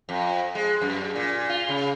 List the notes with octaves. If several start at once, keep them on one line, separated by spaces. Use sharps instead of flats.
F2
G#3
F#2
A#2
F4
C#3